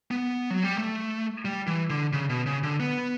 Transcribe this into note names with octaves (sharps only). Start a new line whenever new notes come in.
B3
F#3
G3
A3
G3
E3
D3
C#3
B2
C#3
D3
B3